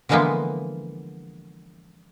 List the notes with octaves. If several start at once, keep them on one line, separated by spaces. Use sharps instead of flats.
D3 E3 F3 G#3 A#3 B3